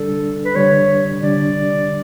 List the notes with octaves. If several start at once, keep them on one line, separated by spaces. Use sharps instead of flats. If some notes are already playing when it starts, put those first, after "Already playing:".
Already playing: D3 G3 D4 A4
B4
D3 G3 D4 C#5
D3 G3 D4 D5